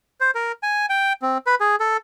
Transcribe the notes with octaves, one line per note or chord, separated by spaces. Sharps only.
C5
A#4
G#5
G5
C4
B4
G#4
A4